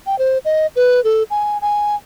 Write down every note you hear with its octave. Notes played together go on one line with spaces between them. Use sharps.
G5
C5
D#5
B4
A4
G#5
G#5